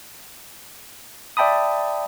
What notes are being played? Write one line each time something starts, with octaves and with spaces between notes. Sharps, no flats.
D5 E5 G5 A5 B5 D#6